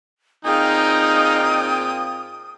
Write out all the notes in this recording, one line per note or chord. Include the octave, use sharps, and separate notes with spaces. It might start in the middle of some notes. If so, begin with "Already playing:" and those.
A#2 C4 D#4 G#4 F5 G5 D#6